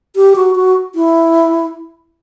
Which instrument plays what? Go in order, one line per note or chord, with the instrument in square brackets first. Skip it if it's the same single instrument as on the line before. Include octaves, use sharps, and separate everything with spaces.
[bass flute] G4
F#4
F#4
E4